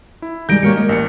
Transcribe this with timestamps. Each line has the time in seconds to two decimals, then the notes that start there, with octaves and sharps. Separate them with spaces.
0.22 E4
0.49 D#3 G3 G#3 G6 A#6 D7
0.63 A#3 G4 A#4 C#5 C#7
0.76 D#5
0.89 A1 C#7